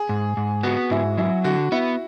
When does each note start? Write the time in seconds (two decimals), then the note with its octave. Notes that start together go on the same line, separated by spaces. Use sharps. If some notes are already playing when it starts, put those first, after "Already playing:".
Already playing: G#4
0.09 G#2
0.37 G#2
0.63 B3 F#4
0.90 G#2 E4
1.17 F#3 E4
1.44 D3 F#4
1.72 B3 E4